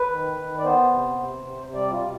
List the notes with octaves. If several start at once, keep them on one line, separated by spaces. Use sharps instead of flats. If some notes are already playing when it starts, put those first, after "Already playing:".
Already playing: B4
D#3
D#3
D5
B3 C5
C3
C3
C3
G3 D5
F4
B2